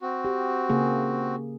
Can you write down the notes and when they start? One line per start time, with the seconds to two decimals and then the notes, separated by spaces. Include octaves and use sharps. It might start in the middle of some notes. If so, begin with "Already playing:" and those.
0.01 C4 F#4
0.25 G4
0.69 C#3 A#3 G#4